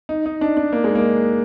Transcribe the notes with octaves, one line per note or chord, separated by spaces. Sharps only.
D#4
D#4
D4
D4
A#3
G#3
A#3